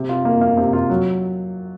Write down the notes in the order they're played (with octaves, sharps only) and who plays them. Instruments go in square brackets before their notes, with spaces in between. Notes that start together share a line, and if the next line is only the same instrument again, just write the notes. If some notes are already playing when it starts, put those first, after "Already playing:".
Already playing: [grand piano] C3
F4
A#3
A#3
C3
F4
F#3